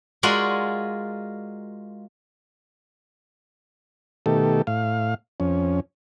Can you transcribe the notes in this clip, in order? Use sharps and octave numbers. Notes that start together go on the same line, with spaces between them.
G#3 F4 F#4 A#4 D5 F#5
B2 D#3 A3 G4 A4
A2 F5
F2 C#4